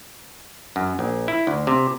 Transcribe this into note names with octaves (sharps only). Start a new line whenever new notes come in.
F#2
A#1
E4
D2
C3